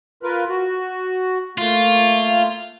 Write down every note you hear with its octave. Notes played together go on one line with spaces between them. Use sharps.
F4 A#4 B4
F#4
A3 A#3 F4